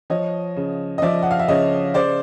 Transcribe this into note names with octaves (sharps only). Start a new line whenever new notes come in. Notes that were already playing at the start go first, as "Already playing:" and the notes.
F3 C#5 D#5
C#3
D#5
F3 D5 E5
F#5
F5
E5
C#3 C#5 D#5
C#3 C5 D5